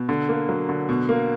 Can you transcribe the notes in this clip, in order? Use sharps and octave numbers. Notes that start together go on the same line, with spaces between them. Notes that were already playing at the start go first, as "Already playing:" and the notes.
Already playing: B2
D3
A#3
F#3
D3
B2
A#3